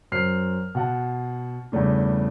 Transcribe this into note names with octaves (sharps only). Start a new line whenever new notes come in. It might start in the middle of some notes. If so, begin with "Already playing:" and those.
F#2 C5 F6 C7
B2 F#5 A5
E2 G2 C#3 A3 D4